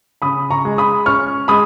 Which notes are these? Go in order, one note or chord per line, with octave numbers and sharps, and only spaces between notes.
C#3 B5 D#6
A#5 C#6
G#3
B5 D#6
C#4 C#6 F6
G#3 B5 D#6